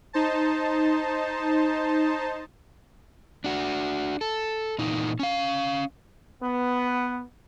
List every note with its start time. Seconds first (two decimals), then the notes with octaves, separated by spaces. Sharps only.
0.13 D#4 C5 A5
3.44 D4 F#4
4.21 A4
4.79 A#2 E3 D#4
5.19 C#4 F5
6.42 B3